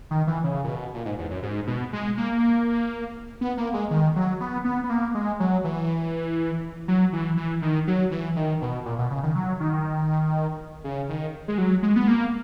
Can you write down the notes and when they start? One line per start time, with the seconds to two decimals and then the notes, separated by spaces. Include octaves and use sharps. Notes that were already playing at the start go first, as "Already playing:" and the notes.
0.11 D#3
0.27 E3
0.44 C#3
0.64 A#2
0.69 B2
0.94 A#2
1.05 G#2
1.18 E2
1.31 F#2
1.43 G#2
1.67 B2
1.93 G#3
2.17 A#3
3.41 B3
3.57 A#3
3.74 G#3
3.91 D#3
4.16 F#3
4.41 B3
4.64 B3
4.84 B3
4.90 A#3
5.15 G#3
5.40 F#3
5.64 E3
6.88 F#3
7.13 E3
7.37 E3
7.62 D#3
7.87 F#3
8.11 E3
8.36 D#3
8.62 B2
8.86 A#2
8.98 B2
9.11 C#3
9.23 D#3
9.35 F#3
9.60 D#3
10.84 C#3
11.09 D#3
11.48 G#3
11.58 F#3
11.83 G#3
11.96 B3
12.08 A#3